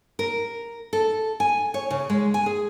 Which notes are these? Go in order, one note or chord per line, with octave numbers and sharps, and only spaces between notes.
A#4
A4
G#5
C#5
C#3
G#3
G#5
G#4